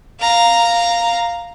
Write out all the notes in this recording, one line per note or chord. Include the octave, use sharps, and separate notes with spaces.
F5 A#5